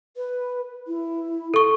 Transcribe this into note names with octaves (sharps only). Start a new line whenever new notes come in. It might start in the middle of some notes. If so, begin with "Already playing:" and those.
B4
E4
A4 C#6